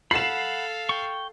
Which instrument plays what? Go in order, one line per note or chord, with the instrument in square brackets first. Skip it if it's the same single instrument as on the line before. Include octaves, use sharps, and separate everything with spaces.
[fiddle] A4 F5 [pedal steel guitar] F#5 B5 [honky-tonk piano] C7 E7
[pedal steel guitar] G5 C#6